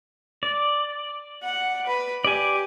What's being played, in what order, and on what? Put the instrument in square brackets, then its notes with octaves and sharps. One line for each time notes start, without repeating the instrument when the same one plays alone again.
[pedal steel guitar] D5
[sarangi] F#5
B4
[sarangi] G4 [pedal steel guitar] D5 G#5